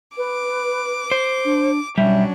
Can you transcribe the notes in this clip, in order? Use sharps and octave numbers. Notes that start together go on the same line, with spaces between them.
B4 D6
C5
D4
B1 F#3 G3 C#4 D4 E5